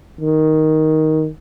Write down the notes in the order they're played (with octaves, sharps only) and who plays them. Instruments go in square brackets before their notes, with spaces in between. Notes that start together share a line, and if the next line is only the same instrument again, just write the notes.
[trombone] D#3